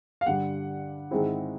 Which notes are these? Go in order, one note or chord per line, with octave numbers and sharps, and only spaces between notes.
F5
G2 D3 G3 F#5
G#2 D#3 G#3 C4 E4